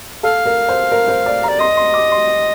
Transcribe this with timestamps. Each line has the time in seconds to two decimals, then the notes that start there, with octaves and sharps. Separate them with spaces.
0.23 A4 F5
0.46 A#4
0.69 C5
0.91 A#4
1.08 C5
1.26 D5
1.43 A#5
1.48 D5
1.59 D#5 C6
1.77 C6
1.94 D6
2.12 C6